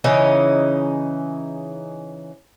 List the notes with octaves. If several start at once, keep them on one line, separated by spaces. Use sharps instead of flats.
C#3 E3 C#4 D#4